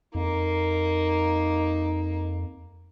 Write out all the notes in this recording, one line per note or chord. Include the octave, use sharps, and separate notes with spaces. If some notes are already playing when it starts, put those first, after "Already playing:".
F2 A#3 D#4